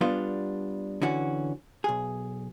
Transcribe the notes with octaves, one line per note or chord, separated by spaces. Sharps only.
G3 B3 D4 F4
D3 E3 C#4 F#4
B1 G#4